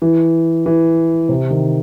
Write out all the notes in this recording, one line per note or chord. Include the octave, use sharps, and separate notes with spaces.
E3
E3
C3
D#3